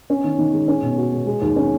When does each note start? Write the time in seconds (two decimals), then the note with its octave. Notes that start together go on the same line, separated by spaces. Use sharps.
0.10 C#4
0.24 D#3
0.38 D#3
0.53 G#3
0.68 C#4
0.82 B2
0.98 F#4
1.12 G#3
1.26 G#3
1.42 D#2
1.56 C#4